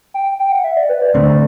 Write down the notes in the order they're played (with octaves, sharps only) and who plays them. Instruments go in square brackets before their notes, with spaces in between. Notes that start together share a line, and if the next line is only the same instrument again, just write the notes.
[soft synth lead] G5
G5
F#5
E5
D5
B4
D5
[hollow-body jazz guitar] D2 D3 A3 C4 [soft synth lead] D5